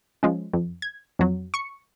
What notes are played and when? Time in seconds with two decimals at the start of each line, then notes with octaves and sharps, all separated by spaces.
0.23 F3 G#3 C#4
0.53 F2
0.82 G#6
1.19 F2 F#3
1.54 C#6 C#7